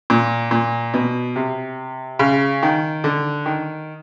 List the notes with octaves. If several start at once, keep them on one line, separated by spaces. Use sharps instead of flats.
A#2
A#2
B2
C3
C#3
D#3
D3
D#3